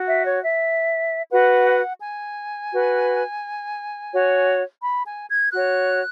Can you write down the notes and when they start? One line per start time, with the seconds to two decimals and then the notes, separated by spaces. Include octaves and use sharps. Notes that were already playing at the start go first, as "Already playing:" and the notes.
Already playing: F#4
0.09 E5
0.25 C#5
0.43 E5
1.31 F#4 B4 F#5
2.01 G#5
2.72 F#4 B4
4.12 F#4 C#5
4.82 B5
5.06 G#5
5.29 G#6
5.52 F#4 C#5 F#6